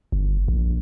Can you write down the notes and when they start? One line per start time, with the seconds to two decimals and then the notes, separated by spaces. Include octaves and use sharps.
0.12 G1
0.48 A#1